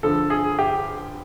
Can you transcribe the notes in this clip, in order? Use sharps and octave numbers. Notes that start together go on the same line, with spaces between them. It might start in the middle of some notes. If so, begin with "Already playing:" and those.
G2 D3 F3 A4
G#4
G4